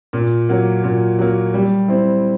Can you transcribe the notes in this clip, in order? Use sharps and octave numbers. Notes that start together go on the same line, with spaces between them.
A#2
F#3 A#3
A#2
F#3 A#3
G3
C4 E4